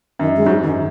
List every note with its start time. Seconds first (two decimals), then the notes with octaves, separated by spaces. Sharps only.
0.19 F#2 D#3
0.36 G#3
0.46 G#2 F#3
0.63 F#2 D#3